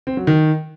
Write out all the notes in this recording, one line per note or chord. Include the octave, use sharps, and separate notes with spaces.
C4
F#3
D#3